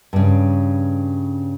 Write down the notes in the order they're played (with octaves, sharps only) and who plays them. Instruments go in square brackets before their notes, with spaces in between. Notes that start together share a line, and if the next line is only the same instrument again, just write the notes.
[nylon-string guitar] G2 C#3